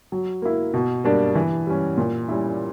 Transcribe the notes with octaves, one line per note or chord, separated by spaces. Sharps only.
F#3
A#3 E4
B2
G3 A#3 D4
E3
G3 C#4
A#2
G3 C#4 E4